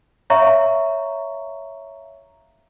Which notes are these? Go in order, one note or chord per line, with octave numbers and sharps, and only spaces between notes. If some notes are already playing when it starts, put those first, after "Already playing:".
C#5 E5 F5 A#5 C#6